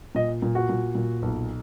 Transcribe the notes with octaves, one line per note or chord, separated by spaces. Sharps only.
A#2 D#5
A#2
F#4
A#2
A#2
B1